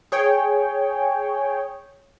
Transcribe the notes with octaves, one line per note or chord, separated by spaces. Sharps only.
G#4 C#5 G5